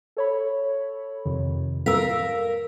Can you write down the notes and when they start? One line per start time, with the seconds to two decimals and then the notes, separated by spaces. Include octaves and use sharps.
0.17 A4 C#5 B5
1.25 F2 C3 D#3
1.86 A#4 F5 E6 B6